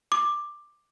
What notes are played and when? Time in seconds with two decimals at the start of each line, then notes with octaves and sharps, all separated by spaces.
0.12 D6